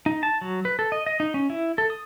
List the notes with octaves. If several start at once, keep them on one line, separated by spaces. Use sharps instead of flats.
D#4
A5
F#3
B4
A4
D#5
D#5
D#4
C#4
E4
A4
D#6